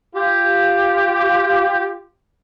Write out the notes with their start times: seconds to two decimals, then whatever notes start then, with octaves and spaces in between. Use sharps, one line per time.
0.15 F4 G4